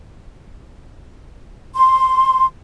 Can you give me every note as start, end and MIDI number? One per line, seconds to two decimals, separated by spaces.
1.75 2.45 84